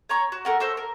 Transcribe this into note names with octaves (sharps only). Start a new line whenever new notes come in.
C#5 A#5 C#6
F#4
A4 A#4 F#5
F#4 A4 C5 E5
A#4